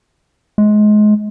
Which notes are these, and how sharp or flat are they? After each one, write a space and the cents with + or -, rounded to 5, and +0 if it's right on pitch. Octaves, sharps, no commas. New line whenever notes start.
G#3 +25